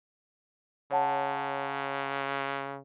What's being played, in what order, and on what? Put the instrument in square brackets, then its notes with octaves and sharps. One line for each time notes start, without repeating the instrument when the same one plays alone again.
[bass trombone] C#3 [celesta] C#5 F#5 A5